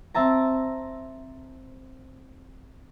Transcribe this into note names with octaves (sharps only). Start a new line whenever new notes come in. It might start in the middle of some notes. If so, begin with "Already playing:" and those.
C4 E5 A5 A#5